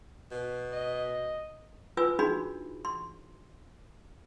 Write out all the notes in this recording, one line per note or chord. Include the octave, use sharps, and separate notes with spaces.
B2
D#5
F4 B4 G#5 E6
D4 D#4 F#4 G#4 B5 C6
C6